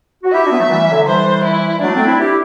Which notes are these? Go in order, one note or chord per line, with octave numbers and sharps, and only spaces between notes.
F#4
E4 G4 E5
D4 F#4
B3
F#3 A3
E3 G3
D3 F#3
E3 G3 C5
E4
F#3 A3 D4
A3 C4
C4 E4
E4 G4